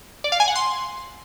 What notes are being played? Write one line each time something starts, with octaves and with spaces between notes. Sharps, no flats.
D5
F5
G#5
F#5
C6